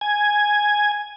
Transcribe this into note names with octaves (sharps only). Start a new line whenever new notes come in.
G#5